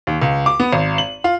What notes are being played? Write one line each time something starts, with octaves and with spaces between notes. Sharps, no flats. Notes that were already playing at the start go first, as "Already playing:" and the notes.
D#2
C#2
D6
B3
G#1
F#7
F4